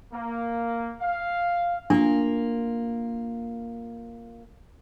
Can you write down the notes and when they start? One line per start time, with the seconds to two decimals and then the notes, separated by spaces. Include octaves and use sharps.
0.13 A#3
1.02 F5
1.90 A#3 D4 F4